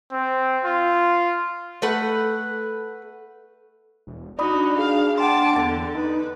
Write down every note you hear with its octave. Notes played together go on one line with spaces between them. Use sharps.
C4
F4
A3 B4 F#5
E1
D4 D#4 F#4 D5 B5 D#6
G#4 F5
F#5 G5 A5 C6 D6
E2 D3 A6
D#4 B4